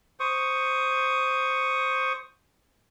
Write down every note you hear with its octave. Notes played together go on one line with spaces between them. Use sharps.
C5 C#6 D#6